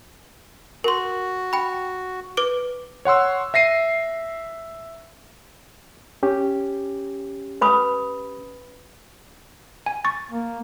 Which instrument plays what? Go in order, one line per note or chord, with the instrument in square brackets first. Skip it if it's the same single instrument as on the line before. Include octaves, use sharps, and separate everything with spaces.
[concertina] F#4 [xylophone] A#4 C6
[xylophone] G5 B5
B4 D6 D7
[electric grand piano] C#5 F#5 C6 E6
E5 A#6 C7 D#7
[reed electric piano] C#4 G4
[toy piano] B4 B5 D#6
[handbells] G#5
C#6 A6
[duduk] A#3